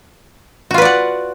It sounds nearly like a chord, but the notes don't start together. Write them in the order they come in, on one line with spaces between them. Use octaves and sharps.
F#4 F4 B4 D5 F#5